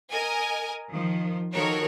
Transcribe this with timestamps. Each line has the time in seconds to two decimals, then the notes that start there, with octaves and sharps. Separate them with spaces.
0.11 A#4 D#5 G#5
0.90 D#3 F3
1.54 D#3 F3 F#4 A4 A#4 C#5